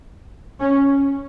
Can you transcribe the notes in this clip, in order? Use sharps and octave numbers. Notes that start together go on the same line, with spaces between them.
C#4